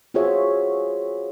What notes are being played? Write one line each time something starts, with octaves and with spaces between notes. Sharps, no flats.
F4 F#4 G#4 C5 C#5 E5